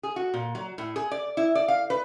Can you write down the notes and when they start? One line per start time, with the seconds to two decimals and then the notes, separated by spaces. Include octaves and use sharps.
0.03 G#4
0.16 F#4
0.34 A#2
0.55 F#3
0.78 A2
0.96 G#4
1.11 D5
1.37 E4
1.55 D5
1.68 F5
1.90 B4